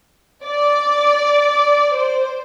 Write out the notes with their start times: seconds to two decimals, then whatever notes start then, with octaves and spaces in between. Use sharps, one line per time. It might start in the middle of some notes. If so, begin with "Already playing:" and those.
0.42 D5
1.93 C5